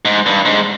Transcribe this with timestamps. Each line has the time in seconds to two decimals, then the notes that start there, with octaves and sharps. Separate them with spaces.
0.05 G#2
0.26 G2
0.45 G#2